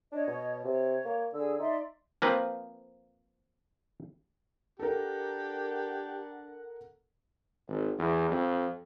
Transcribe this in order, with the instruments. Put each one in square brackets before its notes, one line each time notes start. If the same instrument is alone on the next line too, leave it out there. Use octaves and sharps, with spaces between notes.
[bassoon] D4 [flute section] C#5 D#5
[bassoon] B2
[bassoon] C3 [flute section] C#5
[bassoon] A#3
[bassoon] D3 [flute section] G#4 E6
[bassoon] D#4 [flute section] D5 E5 C6
[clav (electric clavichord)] F3 A#3 C4 B4
[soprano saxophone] D4 [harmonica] G4 [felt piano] A4 A#4 [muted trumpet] F#5
[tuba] G#1
E2
F2